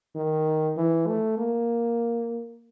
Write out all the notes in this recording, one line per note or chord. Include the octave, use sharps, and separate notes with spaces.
D#3
E3
A3
A#3